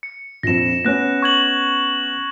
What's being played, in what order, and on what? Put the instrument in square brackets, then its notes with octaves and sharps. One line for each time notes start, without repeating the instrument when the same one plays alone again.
[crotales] C#7
[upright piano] A#1 F2 [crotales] A#6 E7
[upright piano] B3 C#4 [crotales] F#6 A#6
[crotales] C#6 G#6 F#7